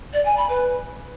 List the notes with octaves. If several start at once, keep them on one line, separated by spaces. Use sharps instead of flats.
D5
G#5
B5
B4